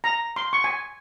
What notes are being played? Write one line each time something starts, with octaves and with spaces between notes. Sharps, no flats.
A#5
C6
C#6
G#5